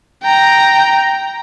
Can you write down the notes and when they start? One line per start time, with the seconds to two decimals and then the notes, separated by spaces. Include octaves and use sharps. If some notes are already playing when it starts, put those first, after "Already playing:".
0.23 G5 A#5